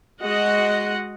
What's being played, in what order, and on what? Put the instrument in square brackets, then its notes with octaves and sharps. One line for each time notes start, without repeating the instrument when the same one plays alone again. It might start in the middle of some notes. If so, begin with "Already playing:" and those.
[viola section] G#3 F#4 D#5 F#5